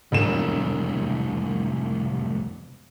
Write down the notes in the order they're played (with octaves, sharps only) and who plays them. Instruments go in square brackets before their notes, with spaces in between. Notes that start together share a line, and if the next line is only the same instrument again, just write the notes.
[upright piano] E1 E7 [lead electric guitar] C2 F2